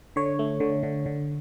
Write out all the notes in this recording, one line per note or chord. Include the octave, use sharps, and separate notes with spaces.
D3 C#5
A3
D3
D3
D3